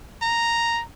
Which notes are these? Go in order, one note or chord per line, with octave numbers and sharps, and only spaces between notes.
A#5